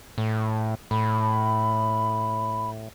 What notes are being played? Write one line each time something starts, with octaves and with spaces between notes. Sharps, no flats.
A2
A2 B5